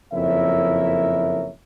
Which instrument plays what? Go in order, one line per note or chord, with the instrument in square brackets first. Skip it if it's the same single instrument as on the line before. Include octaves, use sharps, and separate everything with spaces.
[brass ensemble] F#1 F2 E4 A#4 C#5 E5